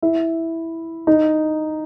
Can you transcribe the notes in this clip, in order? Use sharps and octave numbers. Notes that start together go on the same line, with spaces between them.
E4
D#4